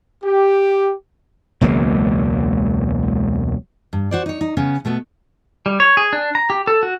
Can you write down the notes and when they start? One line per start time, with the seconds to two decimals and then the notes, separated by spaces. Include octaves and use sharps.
0.23 G4
1.61 E1 C#2 F#3 A#3
3.93 G2
4.11 F#4 C5 D5
4.26 D#4 C#5
4.41 D#4
4.57 C#3 B3 C#4
4.85 B2 A3 B3 F#4
5.66 G3
5.80 C#5
5.97 G#4
6.13 D4
6.35 A#5
6.50 G4
6.67 A4
6.83 F#4